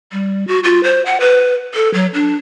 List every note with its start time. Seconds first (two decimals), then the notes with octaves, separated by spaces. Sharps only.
0.12 G3
0.48 F#4
0.64 F4
0.83 C5
1.06 F#5
1.20 B4
1.74 A4
1.94 F#3
2.14 D4